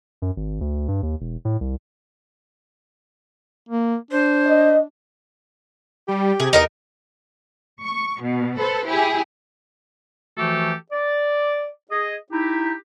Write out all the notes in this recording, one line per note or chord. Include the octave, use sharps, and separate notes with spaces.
F#2
G#1
D2
G2
D#2
E1
A2
C2
A#3
D4 C5
D#5
G3 G4
C3 G#4
E2 D#4 A#4 D#5
C#6
B2
A4 B4 C5
E4 G4 G#4
E3 F3 A3 F#4 G4 A4
D5
G#4 D#5
D#4 E4 G4